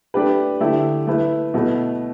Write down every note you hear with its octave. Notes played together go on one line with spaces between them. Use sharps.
A3 D4 G4 B4
D3 A3 E4 G4
A3 E4 B4
B2 A3 E4 B4